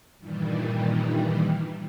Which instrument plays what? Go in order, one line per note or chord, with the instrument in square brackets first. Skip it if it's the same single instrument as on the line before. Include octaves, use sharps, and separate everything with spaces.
[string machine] G2 A#2 D#3 E3 G3